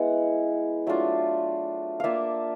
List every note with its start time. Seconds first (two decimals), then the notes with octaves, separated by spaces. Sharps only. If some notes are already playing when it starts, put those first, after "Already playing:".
Already playing: G#3 B3 E4 F#5
0.87 F#3 A3 D4 F4
2.00 A#3 D4 F4 E5 F5